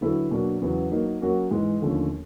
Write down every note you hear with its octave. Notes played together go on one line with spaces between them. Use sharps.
D3 F#3 B3 E4 A4
B2 F#3 A#3 D4
E2 C#3 F#3 B3 E4
F#3 A#3 D#4
F#3 A#3 C#4 F#4 A#4
G#2 E3 G#3
D#2 D3 F3 A3 C#4